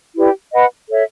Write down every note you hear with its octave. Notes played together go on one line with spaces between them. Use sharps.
E4 G4 B4 D5
B4 D#5 F#5 B5
A4 C#5 E5